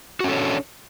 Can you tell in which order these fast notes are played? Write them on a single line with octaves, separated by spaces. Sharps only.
F#4 C#4 A4 C#5 D4